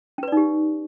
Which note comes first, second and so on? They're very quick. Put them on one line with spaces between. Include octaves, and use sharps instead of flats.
C#4 B4 D5 D#4 G4